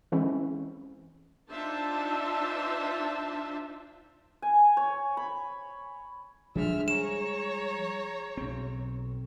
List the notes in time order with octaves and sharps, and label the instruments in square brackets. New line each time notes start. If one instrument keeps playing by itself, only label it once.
[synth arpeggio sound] E3 G#3 C4 C#4 E4
[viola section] D4 D#4 F4 C5 E5 A5
[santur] G#5
C#5
B5
[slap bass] F3 G3 G#3 [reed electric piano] D4 G#4 [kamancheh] E5 F6
[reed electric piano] G#4 [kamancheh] C#5 A#5 [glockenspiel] E7
[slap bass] B1 C4